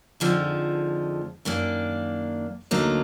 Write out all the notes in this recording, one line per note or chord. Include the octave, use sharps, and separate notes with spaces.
F2 D3 F3 G#3 D#4
F#2 D#3 A#3 D4
D2 D3 F#3 A#3 D#4